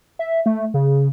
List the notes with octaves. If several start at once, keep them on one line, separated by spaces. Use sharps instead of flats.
E5
A3
C#3